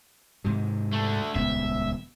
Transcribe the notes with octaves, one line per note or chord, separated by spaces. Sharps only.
G#2 C3 D#3
D3 A3
D#1 C#2 B3 E5